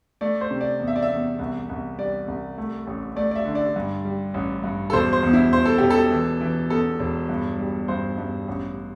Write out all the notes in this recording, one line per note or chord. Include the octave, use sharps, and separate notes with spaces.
A3 D5
C5
C3
D5
E2
E5
D5
E5
E2
C2
C2
G3 D5
C2
A3
A1
A3 D5
D5
E5
D3
D5
G2
G3
A1
G2
A4
E1 C5
C5
E2
E4
E1 C5
A4
E1 G4
A4
E3
E3
E2 A4
E1
G2
G3
G2 C5
G2
A1